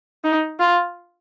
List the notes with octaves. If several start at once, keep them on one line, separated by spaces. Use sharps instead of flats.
D#4
F4